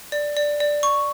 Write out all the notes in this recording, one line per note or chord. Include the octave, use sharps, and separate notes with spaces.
D5
D5
D5
C#6